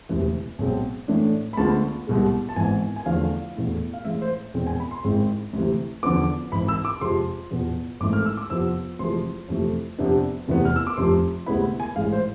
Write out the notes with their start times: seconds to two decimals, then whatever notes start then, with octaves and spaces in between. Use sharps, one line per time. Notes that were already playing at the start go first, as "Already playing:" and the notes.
0.09 E1 D2 C3 E3
0.59 B1 B2 G#3 C4
1.08 A2 E3 A3 D4
1.53 B5
1.57 D2 D3 G#3 B3 F4 A5
2.07 C2 B2 G#3
2.49 A5
2.56 G#1 G#2 E3 B3 G#5
2.96 G#5
3.06 E2 D3 F3 A3 F5
3.55 E2 B2 A3 E4
3.94 F5
4.05 A2 E3 G#3 E5
4.22 C5
4.54 E2 B2 G#3 C4
4.67 G#5
4.80 B5
4.91 C6
5.04 G#1 G#2 G#3 C4 E4
5.53 D2 C3 E3
6.03 E2 D3 F3 B3 D6
6.52 G#1 G#2 E3 B5
6.68 E6
6.85 D6
7.01 F2 C3 F3 G#3 C6
7.51 E2 B2 B3 F4
8.00 G#1 G#2 E3 A3 D6
8.13 F6
8.26 E6
8.37 D6
8.50 F2 C3 F3 B3 F4 E6
8.99 F1 F2 E3 G#3 C6
9.49 F2 C3 E3 A3
9.98 F2 C3 F3 B3 D4
10.48 F1 E2 C3 E3 B3
10.65 F6
10.76 E6
10.87 D6
10.97 F1 F2 C3 F3 C6
11.46 D2 C3 G#3 B3 E4 B5
11.80 G#5
11.96 A1 G#2 E3 G#3 F5
12.12 C5